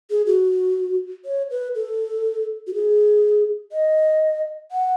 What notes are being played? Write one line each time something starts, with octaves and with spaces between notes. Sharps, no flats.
G#4
F#4
C#5
B4
A4
F#4
G#4
D#5
F#5